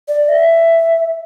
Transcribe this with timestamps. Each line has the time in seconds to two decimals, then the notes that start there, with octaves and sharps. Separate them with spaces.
0.08 D5
0.29 E5